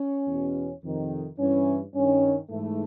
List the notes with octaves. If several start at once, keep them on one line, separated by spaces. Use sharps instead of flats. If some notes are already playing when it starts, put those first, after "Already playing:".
Already playing: C#4
E2 B2
F2 C3 D#3
G2 E3 C#4
G2 D#3 C#4
G#2 E3 A3